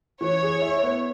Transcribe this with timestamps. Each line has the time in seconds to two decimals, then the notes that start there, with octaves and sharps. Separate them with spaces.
0.21 E3 C#5
0.42 G#4
0.61 E4
0.83 B3